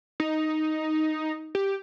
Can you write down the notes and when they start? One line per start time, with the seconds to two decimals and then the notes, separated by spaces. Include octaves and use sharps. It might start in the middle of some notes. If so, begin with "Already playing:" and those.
0.20 D#4
1.55 G4